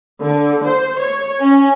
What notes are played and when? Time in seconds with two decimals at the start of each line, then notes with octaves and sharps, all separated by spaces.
0.21 D3
0.64 C5
1.00 C#5
1.40 C#4